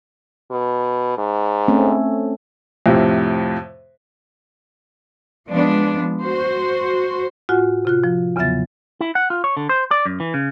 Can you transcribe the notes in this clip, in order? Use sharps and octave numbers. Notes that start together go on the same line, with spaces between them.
B2
G#2
A3 C4 C#4
F2 A2 C3
F3 G#3 B3 D4
F#4 C5
A2 F4 F#4 F#5 G#5
C3 F4 F#6
F3
E2 C#3 F#3 B3 E5 A6
E4
F#5
F4
C#5
D3
C5
D5
F#2
E3
C#3